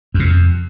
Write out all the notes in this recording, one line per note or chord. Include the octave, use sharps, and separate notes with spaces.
F#2
C3
F2